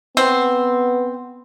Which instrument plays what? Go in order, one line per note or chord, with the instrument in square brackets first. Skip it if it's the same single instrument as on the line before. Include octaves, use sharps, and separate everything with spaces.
[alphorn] B3 [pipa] C4